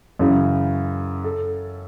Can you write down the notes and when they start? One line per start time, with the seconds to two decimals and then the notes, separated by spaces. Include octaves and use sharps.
0.19 F#2 C#3 E3
1.24 A4